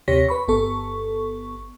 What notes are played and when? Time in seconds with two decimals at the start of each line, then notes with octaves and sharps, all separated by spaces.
0.08 D#2 C3 G4 C#5 A#6 B6
0.29 B4 B5 C#6
0.48 G1 B3 A4 C#6